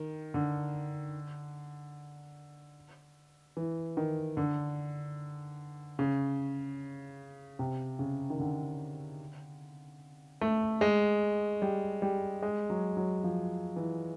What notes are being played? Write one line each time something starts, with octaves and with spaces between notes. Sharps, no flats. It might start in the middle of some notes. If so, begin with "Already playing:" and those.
Already playing: D#3
D3
E3
D#3
D3
C#3
C3
C#3
D#3
D3
A3
G#3
G3
G3
G#3
F#3
F#3
F3
E3